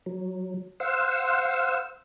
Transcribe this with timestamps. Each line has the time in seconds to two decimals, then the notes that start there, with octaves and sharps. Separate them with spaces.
0.06 F#3
0.80 C5 F5 F#5 E6